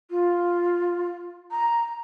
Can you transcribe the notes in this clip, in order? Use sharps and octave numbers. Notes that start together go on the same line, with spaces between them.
F4
A#5